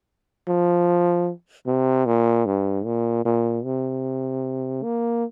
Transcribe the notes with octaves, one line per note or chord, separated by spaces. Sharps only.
F3
C3
A#2
G2
A#2
A#2
C3
A#3